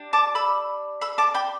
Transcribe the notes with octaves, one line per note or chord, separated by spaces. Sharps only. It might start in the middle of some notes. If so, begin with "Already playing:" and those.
Already playing: D4 G4
A5 D6
B5 E6
B5 E6
A5 D6
G5 B5